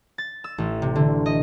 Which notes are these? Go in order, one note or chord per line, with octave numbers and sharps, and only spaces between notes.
A6
E6
A1
C3
D3
D#5